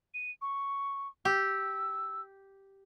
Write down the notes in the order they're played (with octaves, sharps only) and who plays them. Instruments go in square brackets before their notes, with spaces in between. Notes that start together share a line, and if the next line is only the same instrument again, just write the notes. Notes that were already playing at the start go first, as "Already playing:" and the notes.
[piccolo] D#7
C#6
[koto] G4 [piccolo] E6